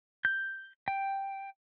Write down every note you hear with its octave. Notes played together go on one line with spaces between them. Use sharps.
G6
G5